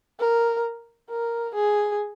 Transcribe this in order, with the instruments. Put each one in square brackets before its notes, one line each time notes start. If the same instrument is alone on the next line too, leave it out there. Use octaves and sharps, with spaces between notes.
[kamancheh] A#4
A#4
G#4